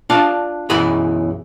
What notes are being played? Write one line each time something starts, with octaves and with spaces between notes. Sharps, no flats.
D4 F4 D5 F5 A5
B1 F#2 E3 E4 G#4 B5